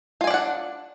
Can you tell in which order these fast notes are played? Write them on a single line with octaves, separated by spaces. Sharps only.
F4 G#5 D5 D4 F#5